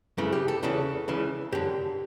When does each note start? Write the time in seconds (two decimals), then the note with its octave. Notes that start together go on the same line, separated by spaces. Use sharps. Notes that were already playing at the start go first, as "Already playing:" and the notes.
0.18 F#2 C#3 E3 A3
0.33 G4
0.48 A4
0.63 E2 C#3 E3 A4
1.08 C#2 C#3 E3
1.52 F#2 D3 G4